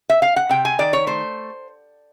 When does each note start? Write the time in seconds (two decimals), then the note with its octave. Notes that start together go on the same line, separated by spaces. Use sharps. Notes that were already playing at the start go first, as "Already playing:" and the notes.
0.09 E5
0.22 F5
0.36 F#5
0.49 C3 G5
0.65 G#5
0.79 D#3 D5
0.93 C#5
1.07 A3 C5